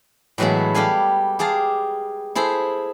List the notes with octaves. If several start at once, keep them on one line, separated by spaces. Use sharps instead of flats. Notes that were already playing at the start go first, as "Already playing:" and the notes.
A2 E3 F#3 G#3 B3 E4
G3 G4 A4 F5 G#5
G4 G#4 F5 A5
E4 G#4 A4 C5